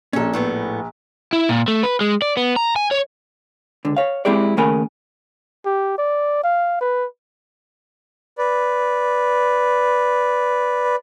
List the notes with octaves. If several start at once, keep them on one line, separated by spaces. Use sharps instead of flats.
A#1 A#2 C#4 A4
A2 A3 B3
E4
A#2
A3
B4
G#3
D5
B3
A#5
G#5
C#5
C#2 D3
C#5 F5
G#3 C4 E4 G4 G#4 D5
D#2 C#3 A3 A#4 G#5 B5
G4
D5
F5
B4
B4 D5